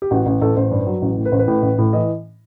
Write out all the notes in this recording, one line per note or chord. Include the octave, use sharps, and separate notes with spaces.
G4
A1 F#4
A1
A1 A4
A1 C5
G2
F#3
A1
A2
B4
A1 C5
B4
A2
A1
A2
E3 D#5